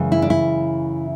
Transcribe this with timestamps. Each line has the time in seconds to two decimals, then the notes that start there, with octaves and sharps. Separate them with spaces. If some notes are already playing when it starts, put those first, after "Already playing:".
Already playing: F#2 C#3 E3 G#3
0.12 E4
0.22 D4
0.30 E4